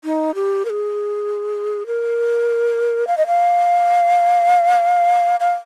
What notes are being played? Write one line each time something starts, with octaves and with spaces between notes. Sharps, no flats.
D#4
G4
A#4
G#4
A#4
F5
D#5
F5
F5